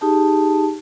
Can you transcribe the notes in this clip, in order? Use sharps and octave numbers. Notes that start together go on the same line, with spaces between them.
D#4 G4 G#4 A5